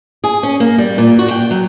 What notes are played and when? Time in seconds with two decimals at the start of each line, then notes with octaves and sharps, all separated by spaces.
0.24 G#4
0.43 C#4
0.60 A#3
0.78 G3
0.98 A#2
1.19 F#4
1.31 G5
1.51 F#3